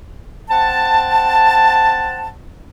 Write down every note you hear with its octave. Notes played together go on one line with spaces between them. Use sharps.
C4 F#5 A5